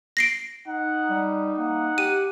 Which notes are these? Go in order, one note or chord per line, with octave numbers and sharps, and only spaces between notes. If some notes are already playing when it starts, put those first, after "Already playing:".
A#6 C7 D7
D#4 F#5
G3
A#3 F#5
G4 D#7